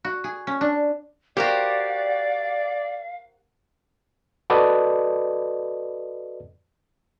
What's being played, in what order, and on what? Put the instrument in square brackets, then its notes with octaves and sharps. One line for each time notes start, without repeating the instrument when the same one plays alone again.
[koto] F#4
G#4
C#4
D4
[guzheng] F#4 A#4 C5 [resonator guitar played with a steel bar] G4 [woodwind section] D5 [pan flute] F5
[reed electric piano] F#4 A4 B4 D5 D#5